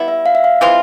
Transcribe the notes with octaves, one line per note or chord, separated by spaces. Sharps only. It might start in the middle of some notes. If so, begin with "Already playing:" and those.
Already playing: G3 B3 E4
E5
F5
E5
F5
E3 G#3 C4 F4